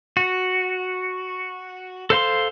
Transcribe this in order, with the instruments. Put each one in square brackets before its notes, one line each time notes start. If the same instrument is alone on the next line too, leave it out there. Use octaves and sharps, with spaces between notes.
[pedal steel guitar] F#4
A4 C5 F5 C6